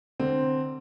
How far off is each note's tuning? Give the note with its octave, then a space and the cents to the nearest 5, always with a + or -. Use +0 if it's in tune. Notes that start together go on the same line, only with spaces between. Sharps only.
D3 +30 C4 +0